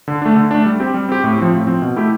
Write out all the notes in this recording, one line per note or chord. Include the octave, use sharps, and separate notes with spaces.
D3
A3 D4
D3
A3 D4
G3
C4 G4
G3
C4 G4
A2
F3 C4
A2
F3 C4
B2
A3 E4 G4